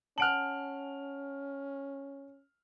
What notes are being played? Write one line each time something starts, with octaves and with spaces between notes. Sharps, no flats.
C#4 F#5 G#5 A5 F6 D7 F#7